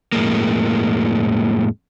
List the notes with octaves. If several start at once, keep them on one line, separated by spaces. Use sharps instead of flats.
F2 A2 G#3 A#3